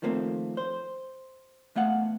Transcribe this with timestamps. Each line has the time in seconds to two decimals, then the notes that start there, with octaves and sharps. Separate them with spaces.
0.02 D#3 F3 A3 A#3 C4
0.57 C5
1.76 E2 A3 F5 F#5